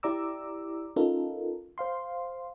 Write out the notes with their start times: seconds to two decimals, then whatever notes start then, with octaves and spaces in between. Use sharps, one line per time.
0.03 E4 G4 D5 A#5 D6 E6
0.96 C#4 D#4 F4 A4 A#4
1.78 C5 F5 C6